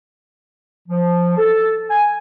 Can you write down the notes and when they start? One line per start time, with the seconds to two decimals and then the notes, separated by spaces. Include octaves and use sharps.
0.88 F3
1.37 A4
1.89 G#5